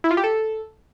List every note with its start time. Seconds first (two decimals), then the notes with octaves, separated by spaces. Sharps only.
0.04 E4
0.11 F4
0.17 G4
0.24 A4